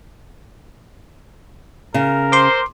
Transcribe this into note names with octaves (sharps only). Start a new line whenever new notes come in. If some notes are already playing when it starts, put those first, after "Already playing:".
C#3 A#4
C5 C6 D6